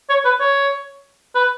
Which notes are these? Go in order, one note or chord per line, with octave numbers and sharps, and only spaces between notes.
C#5
B4
C#5
B4